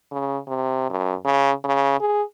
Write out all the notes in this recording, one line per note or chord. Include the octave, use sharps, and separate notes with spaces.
C#3
C3
F#2
C#3
C#3
G#4